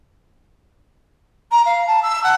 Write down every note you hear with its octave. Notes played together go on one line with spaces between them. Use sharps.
A#5
F5
A5
E6
F#5